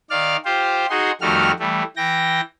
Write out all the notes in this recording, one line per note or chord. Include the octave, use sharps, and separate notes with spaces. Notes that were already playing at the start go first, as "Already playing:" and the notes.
D#3 D5 F5 F6
F4 G4 C5
D#4 F#4 G#4 C6
F2 D#3 G3 A3 F#4 F6
E3 G3 A3
E3 G5 A#6